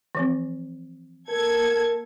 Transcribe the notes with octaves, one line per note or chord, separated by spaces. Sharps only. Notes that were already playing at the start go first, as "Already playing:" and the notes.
E3 F3 C4
A#3 A4 A#4 G#6